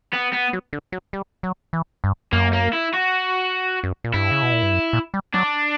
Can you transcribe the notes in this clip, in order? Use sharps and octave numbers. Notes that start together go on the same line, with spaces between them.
B3
B3
F#3
D3
F#3
G3
F#3
E3
G2
F#2 A#3
A#3
E4
F#4
F#2
A#2
G2 E4
C#3
B2
A#2
G2
F#2
A#2
G3
F#3 D4